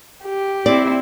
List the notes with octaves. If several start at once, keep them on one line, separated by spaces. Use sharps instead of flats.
G4
C4 E4 D5